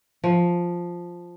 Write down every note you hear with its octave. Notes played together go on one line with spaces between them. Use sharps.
F3